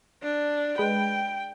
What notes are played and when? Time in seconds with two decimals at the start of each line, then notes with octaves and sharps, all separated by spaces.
0.23 D4
0.78 G#3 B4 G5